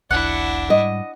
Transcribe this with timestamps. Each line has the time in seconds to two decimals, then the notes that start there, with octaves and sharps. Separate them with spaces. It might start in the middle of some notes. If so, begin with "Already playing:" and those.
0.11 E1 B1 D4 E4 F#5
0.70 G#2 G3 D#5